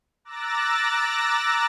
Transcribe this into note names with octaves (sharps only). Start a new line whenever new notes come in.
A#5 D6 E6 F#6 A6 A#6